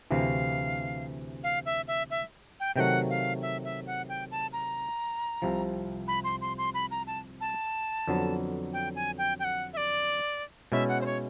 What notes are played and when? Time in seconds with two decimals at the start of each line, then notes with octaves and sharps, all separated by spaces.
0.11 D2 C3 E3 F5
1.44 F5
1.66 E5
1.88 E5
2.10 E5
2.60 G5
2.76 C3 D#3 F#3 A3 F#5 G5
3.10 F5
3.42 E5
3.64 E5
3.87 F#5
4.09 G5
4.31 A5
4.53 A#5
5.42 C2 C3 F3
6.08 B5
6.24 C6
6.41 C6
6.58 C6
6.74 B5
6.91 A#5
7.07 A5
7.41 A5
8.08 F2 D3 F#3 B3
8.73 G5
8.96 G#5
9.18 G5
9.40 G5
9.44 F#5
9.73 E5
9.77 D5
10.72 B2 G#3 C#4 E4 E5
10.89 F#5
11.01 C5
11.06 C#5